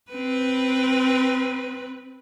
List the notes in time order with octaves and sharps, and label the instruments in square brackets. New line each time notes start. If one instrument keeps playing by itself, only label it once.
[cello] C4 B4